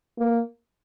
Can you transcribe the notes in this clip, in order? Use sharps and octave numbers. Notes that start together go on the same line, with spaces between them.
A#3